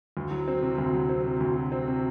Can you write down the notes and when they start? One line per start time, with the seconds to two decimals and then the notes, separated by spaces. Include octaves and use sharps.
0.17 D2
0.31 F#3
0.48 C4
0.62 C3
0.78 D2
0.94 F#3
1.09 C4
1.26 C3
1.40 D2
1.56 F#3
1.72 C4
1.88 C3